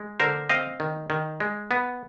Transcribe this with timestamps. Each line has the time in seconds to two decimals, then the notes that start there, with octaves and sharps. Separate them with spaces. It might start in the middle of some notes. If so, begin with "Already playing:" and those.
Already playing: G#3
0.20 D3 A#4 C5
0.49 C4 D#5 F5
0.80 D#3
1.10 D#3
1.40 G#3
1.71 B3